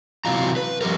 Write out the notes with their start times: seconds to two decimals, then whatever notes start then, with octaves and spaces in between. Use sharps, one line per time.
0.25 C3 E3 F#3 F4 A#5
0.56 B4
0.81 F3 G3 A#4